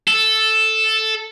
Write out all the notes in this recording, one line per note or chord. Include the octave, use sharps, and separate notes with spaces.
A4